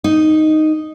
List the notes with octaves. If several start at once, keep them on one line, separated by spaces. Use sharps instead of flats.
D#4